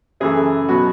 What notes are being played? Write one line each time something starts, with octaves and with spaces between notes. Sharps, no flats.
F#2 C#3 E3 A3 G#4
B2 F#3 B3 F#4